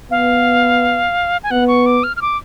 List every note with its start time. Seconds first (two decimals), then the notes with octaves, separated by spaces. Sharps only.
0.10 B3 F5
1.43 G#5
1.51 B3 F#5
1.68 C#6
1.86 D6
2.03 F6
2.16 F6
2.21 D6